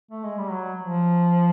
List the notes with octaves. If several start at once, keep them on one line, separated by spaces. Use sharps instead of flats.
A3
G#3
G3
F#3
F3